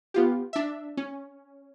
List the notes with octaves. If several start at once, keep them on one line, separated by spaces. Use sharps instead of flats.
B3 F4 G4
D4 E5
C#4